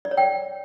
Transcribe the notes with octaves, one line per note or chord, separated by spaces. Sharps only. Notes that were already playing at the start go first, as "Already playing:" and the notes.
D5
C#5
G5